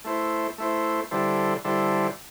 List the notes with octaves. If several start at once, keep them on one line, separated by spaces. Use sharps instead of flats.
A3 E4 C5
A3 E4 C5
D3 G3 E4 A4 C5
D3 G3 E4 A4 C5